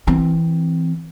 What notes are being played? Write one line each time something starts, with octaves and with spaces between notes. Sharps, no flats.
E3 C4